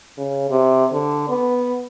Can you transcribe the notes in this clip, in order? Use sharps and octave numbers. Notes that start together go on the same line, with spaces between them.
C#3
C3
D3
B3